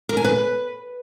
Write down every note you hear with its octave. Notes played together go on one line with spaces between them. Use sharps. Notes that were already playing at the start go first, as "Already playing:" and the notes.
A#4
G#5
B4